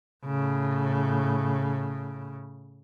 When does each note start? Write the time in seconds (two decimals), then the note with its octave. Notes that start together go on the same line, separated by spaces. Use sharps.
0.24 A2 C#3